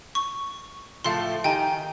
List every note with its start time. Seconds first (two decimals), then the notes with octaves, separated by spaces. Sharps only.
0.15 C#6
1.04 A2 F3 A3 F5 C6
1.44 D#3 D#4 G4 G5 G#5